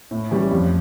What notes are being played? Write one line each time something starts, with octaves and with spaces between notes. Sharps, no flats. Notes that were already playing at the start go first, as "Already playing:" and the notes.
A2
E3 G3 C#4
F2